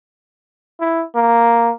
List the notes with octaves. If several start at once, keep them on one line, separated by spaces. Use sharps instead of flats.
E4
A#3